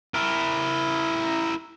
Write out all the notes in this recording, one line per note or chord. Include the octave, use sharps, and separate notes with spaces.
E4 A#4